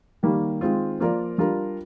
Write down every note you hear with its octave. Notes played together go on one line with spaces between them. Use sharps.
D#3 G3 A#3
D#3 G#3 C4 F4
F3 A#3 F4 A#4 D5
G3 D4 F4 A#4